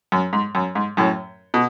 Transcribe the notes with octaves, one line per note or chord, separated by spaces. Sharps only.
F#2
G#2
F#2
G#2
F#2 A2
B2